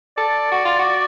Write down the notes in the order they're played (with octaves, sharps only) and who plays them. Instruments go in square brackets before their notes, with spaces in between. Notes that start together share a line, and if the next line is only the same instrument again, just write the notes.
[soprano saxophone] A4 [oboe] D5
[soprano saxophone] F#4
F4
F#4